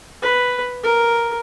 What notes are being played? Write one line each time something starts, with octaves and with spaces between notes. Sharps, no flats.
B4
A#4